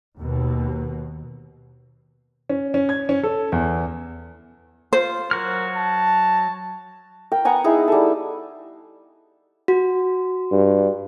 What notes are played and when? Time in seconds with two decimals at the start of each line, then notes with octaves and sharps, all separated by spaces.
0.18 D#2 B2
2.49 C#4
2.74 C#4
2.89 G#6
3.09 C#4
3.23 A4
3.52 E2
4.93 F4 C5
5.31 F#3 F#4 A#4 F6
5.75 A5
7.32 A#4 G5
7.45 B3 F#5 G#5 A#5
7.64 D#4 E4 G#4
7.88 G3 A4
9.68 F#4
10.51 G2